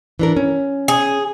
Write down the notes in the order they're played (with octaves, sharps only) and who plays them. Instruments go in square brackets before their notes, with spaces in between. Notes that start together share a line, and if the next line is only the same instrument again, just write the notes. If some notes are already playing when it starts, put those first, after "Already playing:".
[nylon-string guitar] E3 D4 A#4
C#4
[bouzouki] G#4